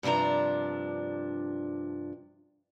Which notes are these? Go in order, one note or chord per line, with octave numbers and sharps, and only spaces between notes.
G2 C3 F3 D4 A#5